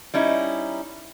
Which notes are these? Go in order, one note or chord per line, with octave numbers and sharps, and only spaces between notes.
G3 C#4 D#4 E4